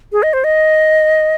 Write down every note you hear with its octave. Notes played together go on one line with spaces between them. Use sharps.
G#4
D#5
C5
D#5